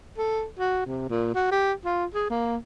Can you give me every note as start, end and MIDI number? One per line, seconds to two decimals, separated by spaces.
0.18 0.45 69
0.59 0.84 66
0.86 1.06 48
1.09 1.30 46
1.35 1.48 66
1.51 1.73 67
1.85 2.05 65
2.14 2.26 68
2.30 2.57 58